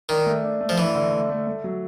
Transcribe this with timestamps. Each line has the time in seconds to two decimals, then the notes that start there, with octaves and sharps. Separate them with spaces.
0.09 D#3 D4
0.26 A3
0.44 D4
0.61 A3
0.69 F3
0.78 E3 D4
0.95 D3
1.13 A3
1.29 A3
1.47 A3
1.64 F#3